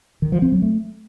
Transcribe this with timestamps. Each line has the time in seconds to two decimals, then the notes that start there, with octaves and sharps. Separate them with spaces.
0.22 D#3
0.32 F3
0.42 C4
0.52 F#3
0.62 A3